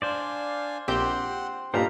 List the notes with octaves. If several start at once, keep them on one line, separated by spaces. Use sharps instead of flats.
D4 C5 D5 F5 G#5
A#1 C4 G4 F#5 C6 G6
G2 A#2 D#4 A4 C5 F5 A#5 B5